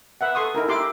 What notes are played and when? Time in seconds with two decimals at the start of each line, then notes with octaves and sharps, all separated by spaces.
0.21 B4 E5 F#5
0.35 A4 C6 C#6 D#6
0.55 D#4 E4 A#4
0.68 E4 G4 C6 D6